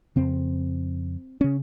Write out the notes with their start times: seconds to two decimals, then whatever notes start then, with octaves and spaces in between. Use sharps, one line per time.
0.16 F2 C#3 C4
1.41 C#3 C#4